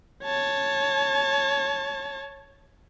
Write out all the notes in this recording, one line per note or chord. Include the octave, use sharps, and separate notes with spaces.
C#5 A5